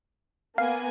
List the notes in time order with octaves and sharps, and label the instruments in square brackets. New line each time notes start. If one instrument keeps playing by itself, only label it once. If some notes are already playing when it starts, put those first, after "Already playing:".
[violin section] A#3 B3 G#5 [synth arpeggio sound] F5